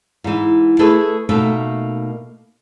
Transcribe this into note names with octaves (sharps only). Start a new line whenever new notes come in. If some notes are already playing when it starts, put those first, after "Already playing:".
G#2 E3
A3 E4 G#4 A4 B4
B2 A3 A#3 D#4 E5